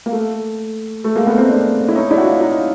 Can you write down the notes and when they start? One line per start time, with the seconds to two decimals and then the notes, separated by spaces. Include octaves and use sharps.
0.06 A#3
0.12 A3
1.04 A3
1.16 G#3 A#3
1.27 A3 B3
1.38 A#3 C4
1.50 C4 D4
1.89 E4
1.95 C#4 D#4
2.10 D4 E4
2.18 F#4
2.26 D#4 F4
2.41 D#4 F4